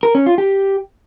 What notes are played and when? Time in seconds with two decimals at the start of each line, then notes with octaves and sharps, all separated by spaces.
0.03 A#4
0.15 C#4
0.26 F4
0.38 G4